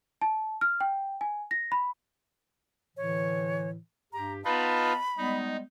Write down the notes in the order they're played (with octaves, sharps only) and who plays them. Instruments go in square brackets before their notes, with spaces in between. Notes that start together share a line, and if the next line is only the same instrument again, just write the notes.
[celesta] A5
F6
G5
G#5
A#6
B5
[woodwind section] A2 D3 E3 [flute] C#5
[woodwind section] G2 G4 [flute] A#5
[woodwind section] B3 D#5 A5 [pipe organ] D#4 F4 B4 [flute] B5
[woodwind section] G3 G#3 B3 [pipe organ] D#4